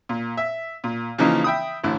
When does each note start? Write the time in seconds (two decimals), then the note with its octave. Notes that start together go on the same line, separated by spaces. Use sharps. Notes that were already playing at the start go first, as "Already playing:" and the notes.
0.09 A#2
0.37 E5
0.84 A#2
1.18 C#3 E3 F3 A#3 D#4 A#4
1.44 E5 G5 B5 D#6
1.84 A1 D2 E4